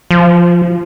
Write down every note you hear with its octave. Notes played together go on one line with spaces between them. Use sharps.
F3